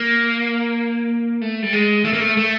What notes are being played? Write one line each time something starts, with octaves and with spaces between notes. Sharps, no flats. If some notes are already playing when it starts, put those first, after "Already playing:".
Already playing: A#3
A3
G3
G#3
A3
A#3
A3
A3